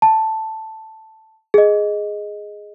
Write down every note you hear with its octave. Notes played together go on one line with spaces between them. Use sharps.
A5
G#4 D#5